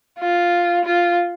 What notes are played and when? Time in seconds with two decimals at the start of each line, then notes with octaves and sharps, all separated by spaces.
0.19 F4
0.85 F4